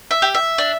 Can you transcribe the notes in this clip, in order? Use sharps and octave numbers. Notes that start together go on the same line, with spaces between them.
E5
G4
E5
D4